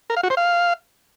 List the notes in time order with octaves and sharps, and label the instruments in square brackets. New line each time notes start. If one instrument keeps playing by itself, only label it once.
[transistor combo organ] A#4
F5
F#4
C5
F5